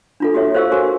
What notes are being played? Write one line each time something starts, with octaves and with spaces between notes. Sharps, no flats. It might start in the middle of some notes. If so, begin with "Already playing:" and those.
D4 F4 A4
F#4 G4 A4 C#5 E5
A4 C5 C#5 F5 C#6 E6
F#4 A#4 C5 G#5 C#6